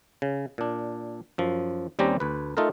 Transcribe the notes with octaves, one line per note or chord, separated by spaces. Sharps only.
C#3
A#2 D4
F#2 F3
D#2 G3 C4 C#4 G4 A#5
D2 B4
A3 D#4 F4 A4 A#4